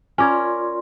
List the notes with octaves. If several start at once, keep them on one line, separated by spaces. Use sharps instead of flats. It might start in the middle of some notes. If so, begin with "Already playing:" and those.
C#4 F4 A#4 D5 G#5 C6 D6 G#6